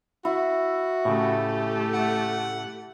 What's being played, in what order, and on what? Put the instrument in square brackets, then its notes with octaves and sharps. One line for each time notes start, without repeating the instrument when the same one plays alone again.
[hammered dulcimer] E4 [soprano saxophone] F#4
[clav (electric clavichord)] A2 C#3 [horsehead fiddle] A3 G4
[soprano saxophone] F#5